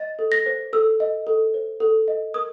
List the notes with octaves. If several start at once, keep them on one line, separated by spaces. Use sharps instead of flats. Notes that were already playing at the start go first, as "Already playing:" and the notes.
Already playing: D#5 A6
A4
A#6
C5
A4 E6
D#5
A4
C5
A4
D#5
A#4 D#6